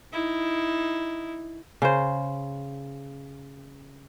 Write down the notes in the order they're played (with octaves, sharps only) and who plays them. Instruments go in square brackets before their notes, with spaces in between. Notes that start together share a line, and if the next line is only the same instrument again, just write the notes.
[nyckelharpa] D#4 E4
[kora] C#3 C5